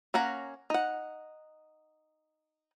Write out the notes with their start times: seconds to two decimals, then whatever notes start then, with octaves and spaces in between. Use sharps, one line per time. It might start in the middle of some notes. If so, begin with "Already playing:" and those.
0.14 A#3 C#4 F#5 A#5
0.70 D#4 F#5